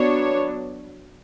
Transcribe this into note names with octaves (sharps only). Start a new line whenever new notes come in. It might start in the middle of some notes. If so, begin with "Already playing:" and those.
Already playing: F#3 B3 D4 C#5